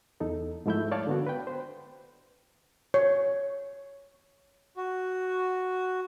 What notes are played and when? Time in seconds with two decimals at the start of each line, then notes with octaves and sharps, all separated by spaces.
0.20 E2 D#4 A4
0.66 G#2 F3 A3 E4 E5 G6
0.92 C#5 D5 F5 A5
1.07 D3 B3 F#4
1.27 B4 G5
1.47 C5
2.94 C#5
4.76 F#4